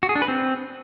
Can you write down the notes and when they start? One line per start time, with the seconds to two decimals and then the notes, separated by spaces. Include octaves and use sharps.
0.03 F#4
0.09 G#4
0.15 D4
0.22 B4
0.28 C4